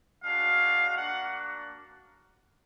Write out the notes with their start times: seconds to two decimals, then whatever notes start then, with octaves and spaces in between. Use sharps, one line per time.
0.23 G#3 D4 F#4 F5
0.96 A#3 D4 F#4 F#5